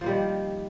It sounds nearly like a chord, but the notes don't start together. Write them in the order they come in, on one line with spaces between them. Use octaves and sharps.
F3 A#3 G3 D#3